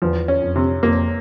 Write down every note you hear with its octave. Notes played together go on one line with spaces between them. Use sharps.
E2 F3
C#4
F2
C3
F2 A#3